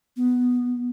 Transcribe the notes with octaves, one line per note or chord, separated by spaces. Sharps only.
B3